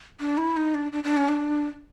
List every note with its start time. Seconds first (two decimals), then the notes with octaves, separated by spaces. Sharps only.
0.20 D4
0.38 E4
0.57 D#4
0.74 D4
0.92 D4
1.04 D4
1.17 C#4
1.29 D4